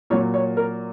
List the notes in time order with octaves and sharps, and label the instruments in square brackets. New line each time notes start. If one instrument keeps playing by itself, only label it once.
[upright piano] A#2 F#3 C#5
C#5
A#4